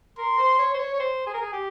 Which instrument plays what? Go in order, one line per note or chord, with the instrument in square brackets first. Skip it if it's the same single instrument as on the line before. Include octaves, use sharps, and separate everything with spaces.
[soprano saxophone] A#4 [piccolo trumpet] C6
[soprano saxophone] C5
C#5
C5
C#5
C#5
C5
G#4
A#4
G#4
G4